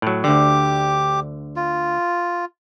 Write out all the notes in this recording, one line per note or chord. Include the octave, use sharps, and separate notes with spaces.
A2 F#3
D2 D3 G4 D6
F4